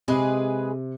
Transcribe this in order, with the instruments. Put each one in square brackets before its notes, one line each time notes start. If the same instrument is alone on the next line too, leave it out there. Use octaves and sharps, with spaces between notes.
[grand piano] C3 [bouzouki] G#3 G#4 B4